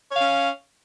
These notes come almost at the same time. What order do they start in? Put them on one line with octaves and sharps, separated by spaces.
C#5 F5 C#4